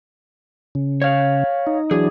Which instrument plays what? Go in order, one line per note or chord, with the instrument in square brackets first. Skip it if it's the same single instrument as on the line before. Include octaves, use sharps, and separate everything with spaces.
[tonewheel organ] C#3
[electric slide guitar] C#5 F5
[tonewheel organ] D#4
[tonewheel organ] E3 F#3 D4 [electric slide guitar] G#4